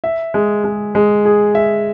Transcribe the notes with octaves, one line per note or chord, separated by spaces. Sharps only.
E5
G#3
G#3
G#3
G#4
E5